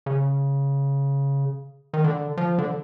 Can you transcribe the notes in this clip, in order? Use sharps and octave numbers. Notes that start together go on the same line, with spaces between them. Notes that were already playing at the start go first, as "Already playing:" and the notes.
C#3
D#3
D3
F3
D3